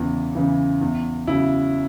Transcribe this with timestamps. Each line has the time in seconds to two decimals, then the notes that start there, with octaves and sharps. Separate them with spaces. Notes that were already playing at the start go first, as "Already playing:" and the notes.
Already playing: E2 C#3 E3
0.35 C#3 E3
0.81 E2
1.27 C#3 F#3 E4